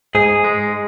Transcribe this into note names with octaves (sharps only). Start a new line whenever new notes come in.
G#2 G#4
G#3